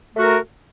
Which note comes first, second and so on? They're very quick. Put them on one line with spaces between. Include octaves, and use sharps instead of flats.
A3 F#4 A#4